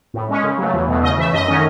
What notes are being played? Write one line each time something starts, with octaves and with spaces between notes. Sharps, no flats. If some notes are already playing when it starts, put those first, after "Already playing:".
A2
G#3 C#4
C#3
F#3 A3
E2
B2 A3
C#3 D#5
E3 A3 E5
F#2 D#5
D#3 A3 C#4